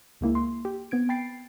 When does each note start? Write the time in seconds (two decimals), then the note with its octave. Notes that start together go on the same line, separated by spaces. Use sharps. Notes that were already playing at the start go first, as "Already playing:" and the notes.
0.21 C#2 G#3 A#3 E4
0.35 C6
0.65 G4
0.91 B3 C4 G#6 D7
1.09 G5 B5 A6 C7 D7